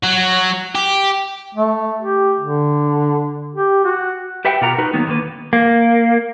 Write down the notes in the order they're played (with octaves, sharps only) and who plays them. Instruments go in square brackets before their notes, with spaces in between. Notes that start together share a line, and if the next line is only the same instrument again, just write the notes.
[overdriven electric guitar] F#3 F#4
G4
[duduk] A3
G4
D3
G4
F#4
[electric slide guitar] G4 B4 E5 F#5 G5
B2 F4 G4 A#4 F#5 A#5
D#4 F#4 A#4 B4
D#3 F#3 A#3 B3 D#4
D3 D#3 A#3 B4
A#3